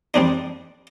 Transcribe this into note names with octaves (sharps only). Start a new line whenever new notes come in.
G3 C4 D4 D#4